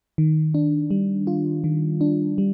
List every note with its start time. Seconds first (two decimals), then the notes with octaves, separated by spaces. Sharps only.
0.18 D#3
0.54 D4
0.91 G3
1.27 F4
1.64 D#3
2.01 D4
2.38 G3